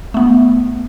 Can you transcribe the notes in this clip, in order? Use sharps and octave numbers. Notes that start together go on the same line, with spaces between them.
A3 B3